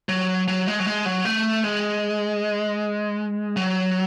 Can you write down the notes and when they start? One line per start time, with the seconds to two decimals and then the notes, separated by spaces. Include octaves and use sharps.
0.09 F#3
0.48 F#3
0.67 G#3
0.80 F#3
0.86 G#3
1.06 F#3
1.25 A3
1.64 G#3
3.56 F#3